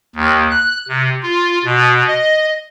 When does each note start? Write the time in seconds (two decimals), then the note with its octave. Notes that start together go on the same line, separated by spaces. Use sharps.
0.15 D#2
0.50 F#6
0.88 C3
1.22 F4
1.65 B2
2.07 D#5